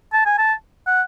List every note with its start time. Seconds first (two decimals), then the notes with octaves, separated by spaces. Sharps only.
0.13 A5
0.26 G#5
0.39 A5
0.87 F#5